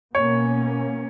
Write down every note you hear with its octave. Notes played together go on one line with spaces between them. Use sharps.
B2 A#3 C#4 C#5